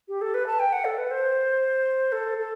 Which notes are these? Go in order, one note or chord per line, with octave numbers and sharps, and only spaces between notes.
G4
A4
B4
A5
G5
F#5
A4
B4
C5
A4
A4